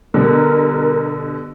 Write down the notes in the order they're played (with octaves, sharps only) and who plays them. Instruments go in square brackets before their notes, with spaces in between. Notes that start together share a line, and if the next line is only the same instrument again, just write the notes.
[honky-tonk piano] B2 D3 G3 [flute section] A#4